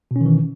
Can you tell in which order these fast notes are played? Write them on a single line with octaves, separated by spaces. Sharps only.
B2 C#4 D#3 E3